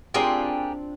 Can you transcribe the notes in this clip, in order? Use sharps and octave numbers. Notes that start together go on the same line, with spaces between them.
C4 D4 F4 G4 G#4 A#4